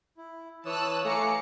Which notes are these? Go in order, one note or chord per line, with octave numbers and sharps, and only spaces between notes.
E4
E3 C#5 A5 D#6 E6 F#6
A3 F5 G#5 A#5 D6 C#7